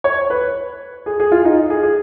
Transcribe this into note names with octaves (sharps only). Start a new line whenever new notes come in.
C#5
B4
G#4
G#4
F4
D#4
G#4
G#4